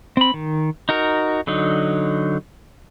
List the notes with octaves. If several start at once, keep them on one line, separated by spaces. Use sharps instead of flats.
C4 B5
D#3
D#4 F#4 A#4
D3 F#3 D#4